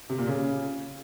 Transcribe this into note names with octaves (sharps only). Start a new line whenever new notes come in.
C3
A#2
C#3